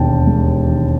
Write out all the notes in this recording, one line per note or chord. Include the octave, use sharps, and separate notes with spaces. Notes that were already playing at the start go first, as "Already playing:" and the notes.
Already playing: E1 D#2 G5 A5
G#3
D#3